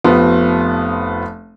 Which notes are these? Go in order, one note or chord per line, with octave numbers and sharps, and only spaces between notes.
F1 F3 B3 C6